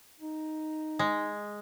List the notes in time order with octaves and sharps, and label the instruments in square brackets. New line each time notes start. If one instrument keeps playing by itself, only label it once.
[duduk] D#4
[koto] G#3